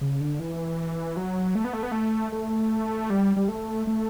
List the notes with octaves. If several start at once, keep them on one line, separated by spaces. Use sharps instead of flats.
C#3
D3
E3
F#3
A3
B3
A3
B3
A3
A3
G3
G3
A3
A3